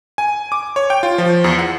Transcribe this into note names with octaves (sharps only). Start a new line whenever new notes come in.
G#5
D6
C#5
G5
F4
F3
E2
F#5